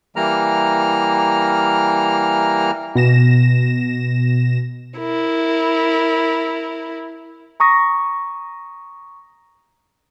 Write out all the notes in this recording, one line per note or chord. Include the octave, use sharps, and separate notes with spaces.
E3 G3 A#3 A#5 F6
B2 A#6 E7
E4 A#4
A#5 C#6 D#6 A#6